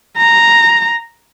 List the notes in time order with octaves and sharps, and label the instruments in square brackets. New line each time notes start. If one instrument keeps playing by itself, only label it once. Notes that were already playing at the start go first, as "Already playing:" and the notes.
[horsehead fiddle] A#5